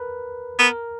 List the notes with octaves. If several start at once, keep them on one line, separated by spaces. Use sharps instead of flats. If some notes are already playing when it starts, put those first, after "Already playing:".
Already playing: A#4 B4
B3 A#4